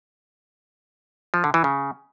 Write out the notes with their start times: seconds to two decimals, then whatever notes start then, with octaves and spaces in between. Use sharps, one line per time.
1.34 F3
1.44 D3
1.54 E3
1.64 C#3